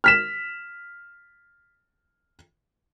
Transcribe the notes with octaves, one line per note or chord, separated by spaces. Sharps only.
F6 B6 E7